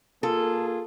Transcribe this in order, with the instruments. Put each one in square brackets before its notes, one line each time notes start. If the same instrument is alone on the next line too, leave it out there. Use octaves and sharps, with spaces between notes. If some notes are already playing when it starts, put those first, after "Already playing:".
[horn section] A#3 F4 G#4 [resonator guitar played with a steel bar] A4